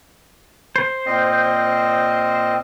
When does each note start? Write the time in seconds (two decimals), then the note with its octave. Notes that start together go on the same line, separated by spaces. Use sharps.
0.76 C5
1.06 A#2 C4 D#5